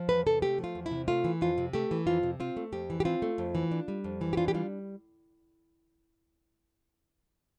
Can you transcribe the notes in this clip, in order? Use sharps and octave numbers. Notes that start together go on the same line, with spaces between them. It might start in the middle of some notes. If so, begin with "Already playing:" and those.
Already playing: F3
E2 B4
C3 A4
A3 G4
F3
F4
E2
E4
C3
A3 F4
E3
F2 F4
C3
A3 G4
E3
F2 F4
C3
C4 F4
A3
F2 G4
E3
G4
C4 F4
A3
F2
E3
D4
G3
F2
E3
G4
D4 F4
G4
G3 F4